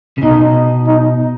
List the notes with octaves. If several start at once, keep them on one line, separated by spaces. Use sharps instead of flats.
C#3
B2 D#4
D#4